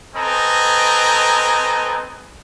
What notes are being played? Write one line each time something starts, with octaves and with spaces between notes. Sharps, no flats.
C4 A4 B4 D#5 G#5 A#5